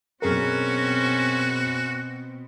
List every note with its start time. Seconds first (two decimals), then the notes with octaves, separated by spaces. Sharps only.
0.22 F#2 B2 C4 C#4 F#4 G#4 A#4